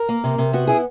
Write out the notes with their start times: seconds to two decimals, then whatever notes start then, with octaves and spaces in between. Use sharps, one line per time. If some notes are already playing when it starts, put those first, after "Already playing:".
Already playing: A#4
0.09 A#3
0.24 C3
0.38 C3
0.53 B3 F#4
0.67 E4 G#4